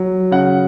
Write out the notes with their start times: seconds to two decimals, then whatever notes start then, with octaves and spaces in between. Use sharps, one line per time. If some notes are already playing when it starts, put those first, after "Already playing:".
Already playing: F#3
0.31 C#3 F#5